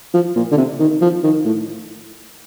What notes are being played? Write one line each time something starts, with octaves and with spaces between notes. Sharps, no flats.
F3
A#2
D3
C3
D#3
F3
D#3
A2